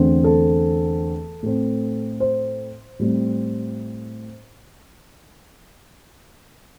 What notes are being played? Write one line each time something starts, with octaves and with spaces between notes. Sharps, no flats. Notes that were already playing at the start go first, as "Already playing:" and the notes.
Already playing: E2 D3 A3 C4
A4
A2 A3 C4
C5
A2 G3 C4